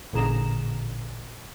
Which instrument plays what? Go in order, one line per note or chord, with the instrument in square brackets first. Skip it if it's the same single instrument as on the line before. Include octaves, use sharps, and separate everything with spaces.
[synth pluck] A1 A#2 D3 G#4 A#5 E7